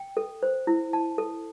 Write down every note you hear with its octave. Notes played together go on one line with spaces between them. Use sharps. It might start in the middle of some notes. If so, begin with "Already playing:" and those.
Already playing: G5
A4
C5
E4
A5
A4